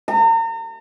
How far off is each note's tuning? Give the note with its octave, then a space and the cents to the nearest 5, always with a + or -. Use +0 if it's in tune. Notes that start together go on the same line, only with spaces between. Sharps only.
A#5 -40